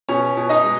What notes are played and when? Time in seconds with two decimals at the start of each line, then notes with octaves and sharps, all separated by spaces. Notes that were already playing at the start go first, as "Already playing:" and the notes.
0.09 B2 C#4 C#5
0.37 B2
0.49 D#4 D#5
0.64 G#3